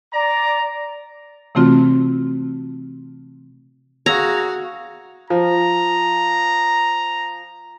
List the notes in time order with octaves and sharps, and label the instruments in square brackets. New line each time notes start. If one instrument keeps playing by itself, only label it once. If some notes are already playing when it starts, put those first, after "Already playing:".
[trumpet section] D5 A#5
[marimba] C3 E3 A3 C4 F4 F#4
[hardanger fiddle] F#4 F5 [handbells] G#4 E6 G#6 [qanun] A#5
[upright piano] F3 [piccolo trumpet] A#5